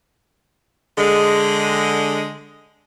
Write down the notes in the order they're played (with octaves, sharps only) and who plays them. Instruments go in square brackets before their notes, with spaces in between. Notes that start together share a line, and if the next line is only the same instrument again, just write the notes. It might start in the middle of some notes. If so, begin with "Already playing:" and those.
[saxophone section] D3 G#3